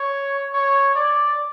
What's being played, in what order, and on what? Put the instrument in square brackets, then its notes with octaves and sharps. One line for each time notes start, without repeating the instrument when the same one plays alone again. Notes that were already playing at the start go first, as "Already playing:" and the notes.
Already playing: [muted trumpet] C#5
C#5
D5